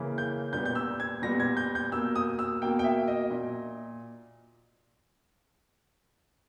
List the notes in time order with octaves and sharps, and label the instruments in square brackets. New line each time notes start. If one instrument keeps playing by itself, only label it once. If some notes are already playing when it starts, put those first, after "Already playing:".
Already playing: [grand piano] C#3 E3 A#3
G6
A#2 G3 B3 G6
G6
E6
G#6
A#2 G3 B3 A#6
G#6
G6
G6
B2 A#3 E6
D#6
E6
B2 A#3 G5
G5
E5
D#5
A#2